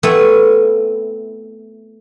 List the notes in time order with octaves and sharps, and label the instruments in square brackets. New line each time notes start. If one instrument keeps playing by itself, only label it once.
[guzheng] A3 B3 C4 E4